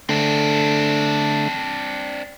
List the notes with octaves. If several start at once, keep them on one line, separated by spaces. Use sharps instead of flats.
D3 A3 C4 D4